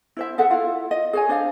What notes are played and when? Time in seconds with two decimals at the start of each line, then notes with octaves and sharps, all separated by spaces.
0.17 E4 C5 E5
0.38 G#4 A4 E5 F#5
0.50 E4 F4 F5
0.91 D#5
1.13 G#4 C#5 G#5
1.29 D4 C5 D#5 F5